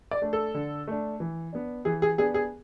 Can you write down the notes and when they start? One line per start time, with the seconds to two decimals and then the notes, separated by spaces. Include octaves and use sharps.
0.11 D5
0.22 A3 D4
0.33 A4
0.54 D3
0.87 A3 D4
1.20 E3
1.53 B3 D4
1.85 E3 G#4
2.02 G#4
2.18 B3 D4 G#4
2.34 G#4